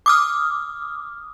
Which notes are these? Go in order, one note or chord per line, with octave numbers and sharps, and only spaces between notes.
D6 D#6 F6